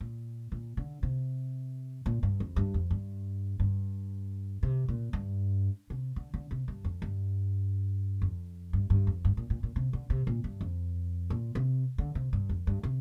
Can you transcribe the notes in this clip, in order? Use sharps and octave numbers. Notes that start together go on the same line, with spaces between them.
A#2
A#2
D3
C3
A#2
G2
F2
G2
F2
G2
G2
C3
A#2
G2
C3
D3
D3
C3
G2
F2
G2
F2
G2
G2
F2
G2
A#2
A#2
A#2
C3
D3
C3
A#2
G2
F2
A#2
C3
D3
C3
G2
F2
G2
C3